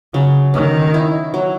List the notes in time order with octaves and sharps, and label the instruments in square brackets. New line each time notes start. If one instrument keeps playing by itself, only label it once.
[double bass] C#3 [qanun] F#3
[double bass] D#3 [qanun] C#4
[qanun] E4
F#3